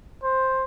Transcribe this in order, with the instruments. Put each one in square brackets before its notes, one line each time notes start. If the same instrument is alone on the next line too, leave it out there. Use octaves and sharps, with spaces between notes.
[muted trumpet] C5